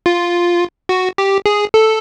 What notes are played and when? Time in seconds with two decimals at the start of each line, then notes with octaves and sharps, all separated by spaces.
0.06 F4
0.89 F#4
1.18 G4
1.46 G#4
1.74 A4